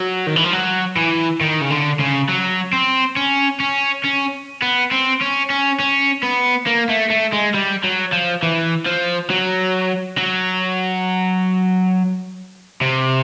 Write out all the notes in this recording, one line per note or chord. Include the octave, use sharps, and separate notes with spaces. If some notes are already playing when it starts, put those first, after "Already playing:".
Already playing: F#3
D#3
E3
F3
F#3
E3
D#3
C#3
D3
C#3
F#3
C4
C#4
C#4
C#4
B3
C4
C#4
C#4
C#4
B3
A#3
A3
A3
G#3
G3
F#3
F3
E3
F3
F#3
F#3
C3